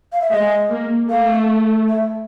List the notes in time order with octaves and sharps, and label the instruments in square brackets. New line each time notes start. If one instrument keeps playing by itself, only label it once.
[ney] F5
E5
[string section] G#3 [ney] D#5
[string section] A#3
[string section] A3 [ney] F5
[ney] E5